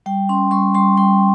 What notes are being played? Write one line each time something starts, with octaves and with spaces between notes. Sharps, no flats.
G3 G5
C#4 C6
G3 C#6
G3 C6
G3 G5